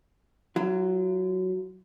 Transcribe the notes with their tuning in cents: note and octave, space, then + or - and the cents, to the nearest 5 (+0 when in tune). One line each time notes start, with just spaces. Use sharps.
F#3 +5 F4 -40